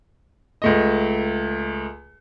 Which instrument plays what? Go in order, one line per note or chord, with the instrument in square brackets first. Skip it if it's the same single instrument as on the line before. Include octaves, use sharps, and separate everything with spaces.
[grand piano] C#2 A3 D#5